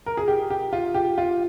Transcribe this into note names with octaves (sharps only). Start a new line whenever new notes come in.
A#4
G#4
G4
G4
F4
G4
F4